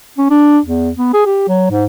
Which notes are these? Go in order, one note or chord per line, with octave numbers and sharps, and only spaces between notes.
C#4
D4
E2
B3
G#4
G4
F#3
G#2